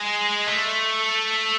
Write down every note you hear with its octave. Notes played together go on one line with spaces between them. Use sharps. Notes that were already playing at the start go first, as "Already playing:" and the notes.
Already playing: G#3
A3